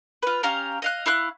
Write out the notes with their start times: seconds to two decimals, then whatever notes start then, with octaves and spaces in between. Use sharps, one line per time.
0.23 F4 B4
0.43 C#4 G4 F5 A#5
0.82 D#5 F5 F#6
1.06 E4 F5 C#6 F#6